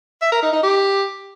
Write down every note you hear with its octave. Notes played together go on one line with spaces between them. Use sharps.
E5
A#4
D#4
D#4
G4